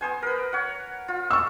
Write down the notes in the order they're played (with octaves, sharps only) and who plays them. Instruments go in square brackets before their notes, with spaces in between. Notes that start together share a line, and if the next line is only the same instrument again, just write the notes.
[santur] B3 C5 G#5
A#4 B4
C#5 F#5
F4
[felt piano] C#6 E6